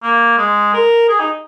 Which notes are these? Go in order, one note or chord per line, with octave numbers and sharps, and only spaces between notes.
A#3
G#3
A#4
G#4
D#4